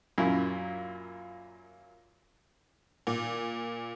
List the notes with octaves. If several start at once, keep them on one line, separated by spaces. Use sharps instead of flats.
F#2 A#2 E4
A#2